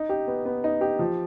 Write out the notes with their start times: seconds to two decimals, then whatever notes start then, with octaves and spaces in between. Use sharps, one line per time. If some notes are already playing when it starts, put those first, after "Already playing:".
Already playing: D#4
0.09 G4
0.28 B3
0.45 B3
0.64 D#4
0.81 G4
0.99 F3